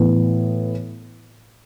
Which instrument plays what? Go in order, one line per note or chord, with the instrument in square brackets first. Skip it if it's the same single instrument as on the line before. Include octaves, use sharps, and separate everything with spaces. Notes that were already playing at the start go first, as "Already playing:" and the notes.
Already playing: [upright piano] A2 E3 B3